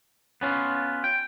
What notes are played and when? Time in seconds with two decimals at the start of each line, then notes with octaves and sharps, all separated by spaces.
0.41 B3 C#4 F4
1.04 G5